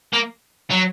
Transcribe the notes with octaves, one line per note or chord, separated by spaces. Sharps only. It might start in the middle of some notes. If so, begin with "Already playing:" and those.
A#3
F#3